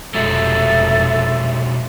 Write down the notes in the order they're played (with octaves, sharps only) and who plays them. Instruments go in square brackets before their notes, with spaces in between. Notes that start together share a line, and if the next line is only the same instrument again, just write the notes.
[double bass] F1 [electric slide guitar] B2 F#3 G#3 [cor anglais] A4 [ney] E5